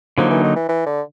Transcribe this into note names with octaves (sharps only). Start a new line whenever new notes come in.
D3 F3 F#3 A#3 D#4
E3
D#3
E3
E3
D3